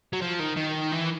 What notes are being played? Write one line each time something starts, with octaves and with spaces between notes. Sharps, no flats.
F#3
F3
D#3
D#3
E3